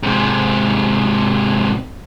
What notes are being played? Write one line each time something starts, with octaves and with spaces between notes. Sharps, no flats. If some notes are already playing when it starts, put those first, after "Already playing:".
G#2 C3